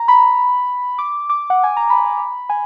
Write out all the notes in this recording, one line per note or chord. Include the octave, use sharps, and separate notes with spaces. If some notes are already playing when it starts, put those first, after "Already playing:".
Already playing: A#5
B5
D6
D6
F#5
G#5
A#5
B5
G#5